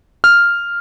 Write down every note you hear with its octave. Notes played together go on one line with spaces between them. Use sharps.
F6